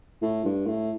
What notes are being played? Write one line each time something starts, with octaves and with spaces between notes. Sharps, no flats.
A2
G2
A2